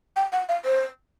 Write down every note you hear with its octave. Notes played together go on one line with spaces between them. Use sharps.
G5
F#5
F5
C5